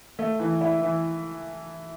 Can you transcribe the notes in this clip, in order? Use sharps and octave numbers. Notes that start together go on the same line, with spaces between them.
A3
E3
E4
E3